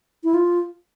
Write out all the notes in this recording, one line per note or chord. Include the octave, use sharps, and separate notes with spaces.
E4
F4